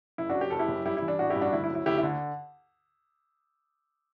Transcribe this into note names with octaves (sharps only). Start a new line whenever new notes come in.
F#1 E4
D4 F#4
F#3
G4
F#1 A4
E4 G4
F#2
G3 E4 G4
E4
E3
D4
A1 D4 F#4
E4 G4
G2
D4 F#4
D2 E4
E4
F#3
E4
D2 E4 G4
E4
D3